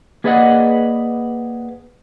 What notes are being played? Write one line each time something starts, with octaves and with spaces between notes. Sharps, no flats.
A#3 G#4 B4 D5 D#5 F#5